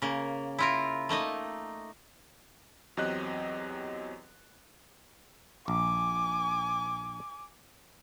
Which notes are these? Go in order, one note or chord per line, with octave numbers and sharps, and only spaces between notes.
C#3 A#3
E4 F4 A#4
A3 A#3 D#4 D#5
E2 F#3 C4 G4 D#5 F#6
A#1 G#5 D6